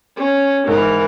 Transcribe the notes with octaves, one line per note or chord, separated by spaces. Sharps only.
C#4
G#2 E3 A#4